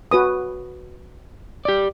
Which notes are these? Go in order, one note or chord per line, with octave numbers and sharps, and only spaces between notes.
F#4 B4 D#6
G4 D5